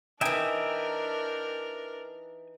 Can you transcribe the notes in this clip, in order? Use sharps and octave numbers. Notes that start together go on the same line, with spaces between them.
E3 D4 D#4 A#4 E5 G5 G#5